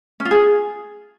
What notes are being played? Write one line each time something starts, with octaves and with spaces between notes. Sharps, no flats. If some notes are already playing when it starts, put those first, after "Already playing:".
C#4
F4
G#4